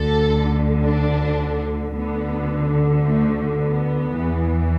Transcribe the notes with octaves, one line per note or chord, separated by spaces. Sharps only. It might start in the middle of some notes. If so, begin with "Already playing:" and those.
Already playing: D2 D3 A4
D4
D2 D3 B3
A3
B3
E2 E3